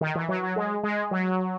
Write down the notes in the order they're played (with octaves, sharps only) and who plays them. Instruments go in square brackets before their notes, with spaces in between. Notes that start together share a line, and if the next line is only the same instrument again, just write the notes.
[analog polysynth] D#3
E3
F#3
F#3
G#3
G#3
F#3